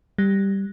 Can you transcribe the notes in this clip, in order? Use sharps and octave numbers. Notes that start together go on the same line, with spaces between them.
G3